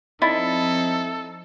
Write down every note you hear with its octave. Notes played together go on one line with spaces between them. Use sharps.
F3 C4 D#4 E4 A4 D5 D#5 B5